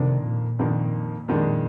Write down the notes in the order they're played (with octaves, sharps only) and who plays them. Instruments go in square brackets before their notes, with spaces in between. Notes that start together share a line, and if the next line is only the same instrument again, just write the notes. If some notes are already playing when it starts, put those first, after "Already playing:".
Already playing: [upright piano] F2 D#3 A#3 D4 [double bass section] C3
[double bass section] A#2
[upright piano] F2 D#3 A#3 D4
F2 D#3 G#3 D4